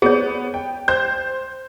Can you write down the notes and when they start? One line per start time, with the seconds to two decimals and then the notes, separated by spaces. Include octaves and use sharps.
0.02 B3 G#4 C#5
0.54 G5
0.88 C5 G6